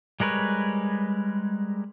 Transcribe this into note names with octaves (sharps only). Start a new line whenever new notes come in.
G3 G#3 A#4 B4 C#5